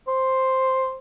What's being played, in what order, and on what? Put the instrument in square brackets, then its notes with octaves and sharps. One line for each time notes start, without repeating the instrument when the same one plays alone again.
[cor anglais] C5